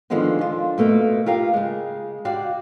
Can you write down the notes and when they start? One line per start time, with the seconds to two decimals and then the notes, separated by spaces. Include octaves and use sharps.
0.10 D3 D#3 F3 G#3 B3 D#4
0.39 D3 F4
0.78 B2 A3 A#3
1.26 F4 G4 A#4 F5
1.54 C#3 G#3
2.25 F#4 G4 D5 F5